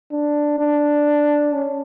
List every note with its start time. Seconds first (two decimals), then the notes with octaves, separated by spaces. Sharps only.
0.11 D4
0.59 D4
1.54 C#4